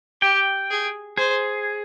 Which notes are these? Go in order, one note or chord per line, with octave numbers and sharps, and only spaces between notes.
G4 G5
G#4
G#4 C5